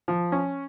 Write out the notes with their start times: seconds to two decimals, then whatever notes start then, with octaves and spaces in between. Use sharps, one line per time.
0.08 F3
0.32 C#4